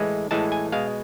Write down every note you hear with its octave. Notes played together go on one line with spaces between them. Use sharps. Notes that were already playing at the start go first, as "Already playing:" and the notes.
Already playing: A2 E3 G#3
A2 E3 G#3 A5
G#5
B2 G#3 F5